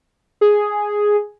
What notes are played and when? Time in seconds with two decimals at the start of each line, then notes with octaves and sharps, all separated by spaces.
0.41 G#4